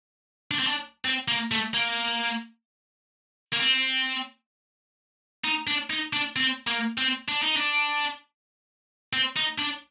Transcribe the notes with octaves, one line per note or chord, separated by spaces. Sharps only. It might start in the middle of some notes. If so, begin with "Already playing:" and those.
D4
C4
D4
C4
A#3
A3
A#3
A#3
C4
D#4
D4
D#4
D4
C4
A#3
C4
D4
D#4
D4
C4
D#4
D4